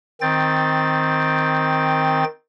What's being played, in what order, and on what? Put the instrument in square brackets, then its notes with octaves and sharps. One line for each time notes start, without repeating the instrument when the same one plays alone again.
[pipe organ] D#3 C4 G5 A6